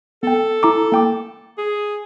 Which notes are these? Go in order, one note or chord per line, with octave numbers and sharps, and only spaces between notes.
B3 A4 G5
E4 A#5 D6
A#3 G5 D6
G#4